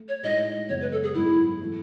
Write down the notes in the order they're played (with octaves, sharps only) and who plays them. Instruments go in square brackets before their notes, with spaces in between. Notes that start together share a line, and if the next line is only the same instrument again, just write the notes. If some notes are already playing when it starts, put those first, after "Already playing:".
Already playing: [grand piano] A3
[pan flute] C#5
[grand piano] A2 G#3 D#4 F#4 [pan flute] D#5
[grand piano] F#2 C#3 G#3 B3 [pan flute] C#5
[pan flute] B4
A4
G#4
[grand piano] G#2 F#3 B3 F#4 [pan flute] E4
[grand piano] E3 A3 E4